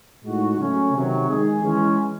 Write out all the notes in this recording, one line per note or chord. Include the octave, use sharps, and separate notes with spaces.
A2 G#3 D#4 F#4
C#3 F#3 A3 C#4
C3 D#3 F#3
D#3 G#3 D#4 G#4
E3 G#3 C#4